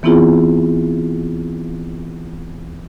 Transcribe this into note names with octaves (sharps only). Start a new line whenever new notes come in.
E3 B3 C4 E4 F4 G#4